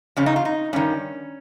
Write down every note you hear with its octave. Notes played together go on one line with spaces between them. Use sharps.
F2 C#3 C#4
D#4
F4
D#4
G2 D#3 C#4